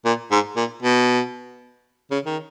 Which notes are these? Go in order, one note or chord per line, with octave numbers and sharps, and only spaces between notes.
A#2
G#2
A#2
B2
C#3
D#3